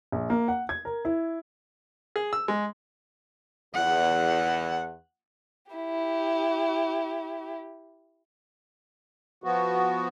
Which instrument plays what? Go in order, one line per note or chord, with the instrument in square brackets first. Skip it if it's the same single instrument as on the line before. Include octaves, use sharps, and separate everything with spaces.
[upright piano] A#1
A#3
F#5
G#6
A#4
E4
[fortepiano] G#4
E6
G#3
[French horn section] E2 [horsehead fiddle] F#5
[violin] E4 G4
[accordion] F3 B3 F#4